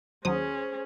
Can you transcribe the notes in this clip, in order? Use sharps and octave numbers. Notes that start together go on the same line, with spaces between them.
D#2 F#3 C#4 G#4 C5 D#6